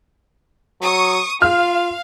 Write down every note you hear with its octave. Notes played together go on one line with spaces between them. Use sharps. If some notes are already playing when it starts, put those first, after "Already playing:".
F#3 C#6 D#6
F4 F5 F6